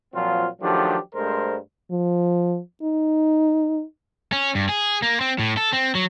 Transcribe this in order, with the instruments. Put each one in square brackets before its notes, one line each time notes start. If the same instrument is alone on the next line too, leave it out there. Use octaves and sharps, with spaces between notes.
[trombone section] A#2 F3 F#3 C4 F4
D#3 F3 F#3 A3 D4 G4
G2 G#3 A3 A#4 C5
[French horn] F3
D#4
[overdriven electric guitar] C#4
G2
G#4
A#3
C4
A2
A4
C4
F#3